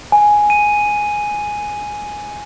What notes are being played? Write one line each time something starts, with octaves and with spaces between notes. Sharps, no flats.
G#5
D#7